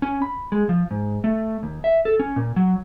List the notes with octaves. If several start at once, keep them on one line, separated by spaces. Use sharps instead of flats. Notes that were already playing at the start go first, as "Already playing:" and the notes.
C#4
B5
G#3
F3
G#2
A3
D#2
E5
A4
C#4
A#2
F#3